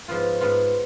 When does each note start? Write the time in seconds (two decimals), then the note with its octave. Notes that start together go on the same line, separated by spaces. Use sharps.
0.08 G#2 F3 B3 F4
0.41 G#2 F3 B3 F4